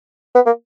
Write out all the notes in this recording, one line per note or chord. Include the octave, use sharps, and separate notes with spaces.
B3
A#3